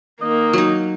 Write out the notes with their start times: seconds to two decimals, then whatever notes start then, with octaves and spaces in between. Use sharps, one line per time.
0.22 D#3 A#3 D#5
0.53 F#3 D#4